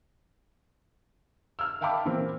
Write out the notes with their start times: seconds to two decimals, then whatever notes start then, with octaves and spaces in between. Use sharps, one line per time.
1.59 E6 F6
1.81 E5 F5 G5 A5 B5 D6
2.06 A#2 E3 C4